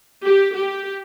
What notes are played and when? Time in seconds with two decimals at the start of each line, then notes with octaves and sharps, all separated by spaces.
0.25 G4
0.55 G4